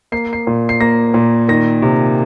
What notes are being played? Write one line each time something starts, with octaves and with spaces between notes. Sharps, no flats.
A#3 C7
C7
A#2
C7
A#3 A#6
A#2
D#3 A#6
C3